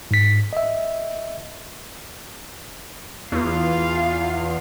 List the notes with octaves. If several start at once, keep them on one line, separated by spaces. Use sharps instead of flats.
G#2 B6
D#5 E5
E2 F4 F5